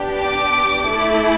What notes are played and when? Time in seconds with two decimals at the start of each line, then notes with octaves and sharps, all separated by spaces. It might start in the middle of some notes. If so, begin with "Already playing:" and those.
Already playing: B3 D4 G4
0.20 D6
0.86 A3 E4 A4